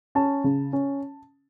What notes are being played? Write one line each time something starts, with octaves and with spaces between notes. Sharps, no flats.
C#4 A5
C#3
C#4